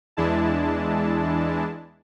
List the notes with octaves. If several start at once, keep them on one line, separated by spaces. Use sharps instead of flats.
E2 E3 G#3 D4 E4 A5